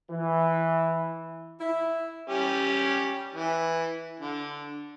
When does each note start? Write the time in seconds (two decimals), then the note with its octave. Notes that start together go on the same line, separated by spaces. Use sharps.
0.11 E3
1.60 E4
2.28 G3 C#4 G4
3.34 E3
4.20 D3